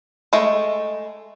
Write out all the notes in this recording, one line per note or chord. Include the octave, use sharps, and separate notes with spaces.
G#3 A3